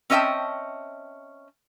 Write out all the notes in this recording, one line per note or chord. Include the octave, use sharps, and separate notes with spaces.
C4 C#4 D#5 E5 G5 A5